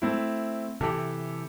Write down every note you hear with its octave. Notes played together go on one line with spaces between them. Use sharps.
A3 C4 E4
C3 E3 G4 A4